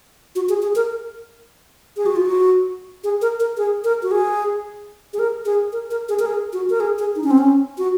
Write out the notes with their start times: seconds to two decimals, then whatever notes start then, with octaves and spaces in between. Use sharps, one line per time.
0.36 F#4
0.49 G#4
0.62 G#4
0.76 A#4
1.97 G#4
2.06 F#4
2.16 F4
2.26 F#4
3.04 G#4
3.22 A#4
3.40 A#4
3.57 G#4
3.84 A#4
4.03 F#4
4.11 G#4
5.13 G#4
5.19 A#4
5.45 G#4
5.72 A#4
5.91 A#4
6.09 G#4
6.19 A#4
6.26 G#4
6.53 F#4
6.70 A#4
6.80 G#4
6.98 G#4
7.16 D#4
7.24 C#4
7.31 C4
7.38 C#4
7.78 F#4